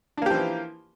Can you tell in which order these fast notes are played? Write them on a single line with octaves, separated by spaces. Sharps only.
D4 A#3 G4 F3 E3